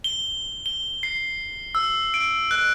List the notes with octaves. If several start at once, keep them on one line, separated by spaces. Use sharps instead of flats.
G7
G7
C7
E6
D7
F#6